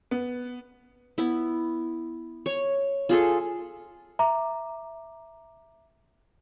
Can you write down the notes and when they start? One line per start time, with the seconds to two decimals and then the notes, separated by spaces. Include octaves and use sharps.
0.11 B3
1.18 B3 E4
2.46 C#5
3.09 F4 G#4 A4
4.19 E5 A#5 D6